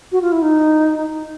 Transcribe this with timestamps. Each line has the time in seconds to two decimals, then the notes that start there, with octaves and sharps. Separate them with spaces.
0.12 F#4
0.22 F4
0.32 E4
0.42 D#4